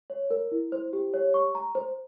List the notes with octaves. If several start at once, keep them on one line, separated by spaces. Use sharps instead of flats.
C#5
A#4
E4
C5
G4
C#5
C#6
A#5
C5